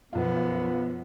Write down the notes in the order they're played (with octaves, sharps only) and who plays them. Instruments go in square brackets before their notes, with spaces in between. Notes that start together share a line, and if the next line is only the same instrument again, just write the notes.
[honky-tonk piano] B1 F4 [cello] F#2 F3 [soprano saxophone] B3